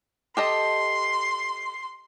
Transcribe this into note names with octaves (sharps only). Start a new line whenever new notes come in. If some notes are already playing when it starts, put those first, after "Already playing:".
G4 A4 D#5 C6